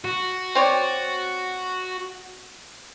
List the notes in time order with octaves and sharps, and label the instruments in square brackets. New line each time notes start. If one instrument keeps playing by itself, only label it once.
[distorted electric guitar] F#4
[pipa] C4 C#5 D5